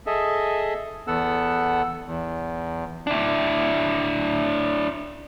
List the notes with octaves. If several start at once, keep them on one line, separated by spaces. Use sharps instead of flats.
G#4 A4 D#5 E5
E2 B3 A4 F#5 E6
E2
D4 E4